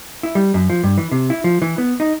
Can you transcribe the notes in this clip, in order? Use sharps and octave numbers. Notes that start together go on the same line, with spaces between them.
E4
G3
F#2
F3
G2
E3
C3
E4
F3
E3
B3
D#4